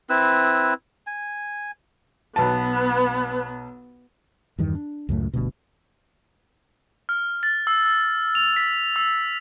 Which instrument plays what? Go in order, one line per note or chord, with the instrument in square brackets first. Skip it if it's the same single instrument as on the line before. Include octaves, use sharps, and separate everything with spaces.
[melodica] C4 E4 B4 E6
G#5
[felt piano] B1 A5 [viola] B3 [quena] B4
[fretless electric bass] E2 G2 D#3
D4
C#2 F#2 A2 A3
G1 D2 G2 B2
[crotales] F6
A6
E6
E6
F7
B6
E6